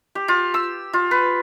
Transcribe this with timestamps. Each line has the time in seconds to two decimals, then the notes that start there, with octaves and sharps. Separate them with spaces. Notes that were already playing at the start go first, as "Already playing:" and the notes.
0.15 G4
0.28 F4
0.54 E6
0.93 F4
1.11 B4